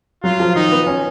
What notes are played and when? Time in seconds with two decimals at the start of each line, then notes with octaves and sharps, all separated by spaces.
0.24 F#3 F4
0.40 F3
0.55 D#3 D#4
0.72 B3
0.87 C#4